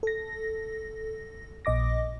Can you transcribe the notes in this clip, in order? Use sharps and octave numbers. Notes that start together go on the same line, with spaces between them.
A4 A#6
A#1 A#2 D#5 D6 A#6